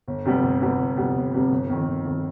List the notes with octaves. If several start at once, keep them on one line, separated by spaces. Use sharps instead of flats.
G1
F2 C3 G3 B3
G1
F2 C3 G3 B3
G1
F2 C3 G3 B3
G1
F2 C3 G3 B3
G1
F2 D#3
G1
F2 D#3